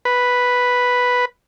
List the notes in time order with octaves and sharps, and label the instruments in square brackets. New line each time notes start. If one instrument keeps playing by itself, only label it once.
[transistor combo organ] B4